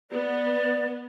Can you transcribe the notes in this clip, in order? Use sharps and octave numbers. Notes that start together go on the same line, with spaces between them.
B3 D5